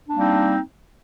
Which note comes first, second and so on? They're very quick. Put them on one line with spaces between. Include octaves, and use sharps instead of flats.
D4 A#3 G3 C4 D#4